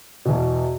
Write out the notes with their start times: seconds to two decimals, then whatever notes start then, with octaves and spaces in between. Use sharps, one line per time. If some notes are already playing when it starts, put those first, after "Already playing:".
0.25 E2 B2